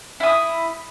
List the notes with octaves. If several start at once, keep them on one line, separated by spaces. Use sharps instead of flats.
E4 D#6